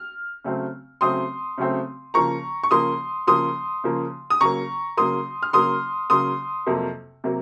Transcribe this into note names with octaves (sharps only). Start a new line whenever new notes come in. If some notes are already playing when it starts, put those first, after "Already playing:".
Already playing: F6
C#3 F#3 A3 C4
C#3 F#3 A3 C4 C6 D#6
C#3 F#3 A3 C4
C#3 F3 A#3 A#5 C#6
C#6
C#3 F3 A#3 C6 D#6
C#3 F3 A#3 C6 D#6
C#3 F3 A#3
D#6
C#3 F#3 A#3 A#5 C#6
C#3 F#3 A#3 C6 D#6
F6
C#3 F#3 A#3 C6 D#6
C#3 F#3 A#3 C6 D#6
F2 C3 F#3 A#3
C3 F#3 A#3